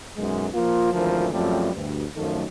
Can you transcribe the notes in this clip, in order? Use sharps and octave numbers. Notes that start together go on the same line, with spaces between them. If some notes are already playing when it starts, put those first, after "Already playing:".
B1 F#2 G#3
F3 A#3 F4
G#1 D2 E3 F3 A#4
F#2 F3 G3 A3 C4
D2 G2
F#2 D#3 F3 A3